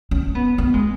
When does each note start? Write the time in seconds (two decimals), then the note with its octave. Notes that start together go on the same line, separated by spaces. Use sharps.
0.11 C#4
0.35 B3
0.58 B3
0.74 G#3